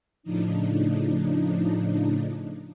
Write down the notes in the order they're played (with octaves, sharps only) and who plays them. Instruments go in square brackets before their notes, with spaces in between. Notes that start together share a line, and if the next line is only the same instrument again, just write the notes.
[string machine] A2 C#3 F3 D4 D#4